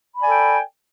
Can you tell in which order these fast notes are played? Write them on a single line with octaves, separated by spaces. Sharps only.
B5 D5 G#5 A4 G5